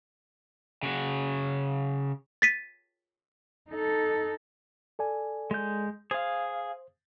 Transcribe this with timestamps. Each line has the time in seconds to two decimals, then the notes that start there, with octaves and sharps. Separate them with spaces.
0.83 C#3 F#4
2.42 A6 B6 D#7
3.70 D#4 A4
4.99 A4 D5 G#5
5.51 G#3 G6
6.11 G#4 C5 F5